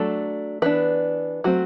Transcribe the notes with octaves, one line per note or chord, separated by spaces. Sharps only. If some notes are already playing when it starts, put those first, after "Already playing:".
Already playing: F#3 A3 D4 A4
E3 B3 D4 B4
F#3 A3 C4 F#4